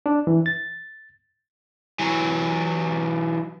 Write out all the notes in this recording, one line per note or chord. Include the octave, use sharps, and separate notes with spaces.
D4
E3
A6
E3 F#3